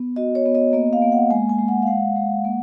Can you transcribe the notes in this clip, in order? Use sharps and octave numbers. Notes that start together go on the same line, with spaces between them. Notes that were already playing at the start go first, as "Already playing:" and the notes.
Already playing: B3
F#4 D#5
C#5
B3
D#5
A#3 D#5
F5
A#3
F#5
G#3 G#5
G#5
G#3
F#5
F5
G#3 F#5
G#3
A#3